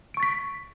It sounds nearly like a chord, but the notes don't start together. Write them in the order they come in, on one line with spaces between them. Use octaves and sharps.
D7 C#6 A6 B6